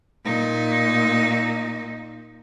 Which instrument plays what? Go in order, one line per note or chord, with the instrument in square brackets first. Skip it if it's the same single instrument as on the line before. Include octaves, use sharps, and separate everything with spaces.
[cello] A#2 D#4